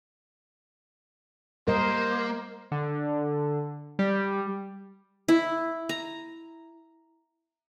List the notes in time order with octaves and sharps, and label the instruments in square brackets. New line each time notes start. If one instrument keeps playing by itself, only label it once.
[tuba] G3 [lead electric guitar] A#3 [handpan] A#4 D#5 [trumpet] C5
[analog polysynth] D3
G3
[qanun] E4
A#5